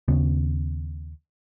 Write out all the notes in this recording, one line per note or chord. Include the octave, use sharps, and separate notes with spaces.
D#2 C#3 B3 C#4